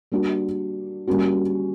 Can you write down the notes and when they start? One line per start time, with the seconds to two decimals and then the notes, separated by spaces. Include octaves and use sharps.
0.12 G3 A#3 D4 F#4
1.07 G3 A#3 C#4 F#4